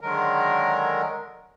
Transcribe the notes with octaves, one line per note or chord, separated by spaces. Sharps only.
D3 D#3 F#3 G#3 A#4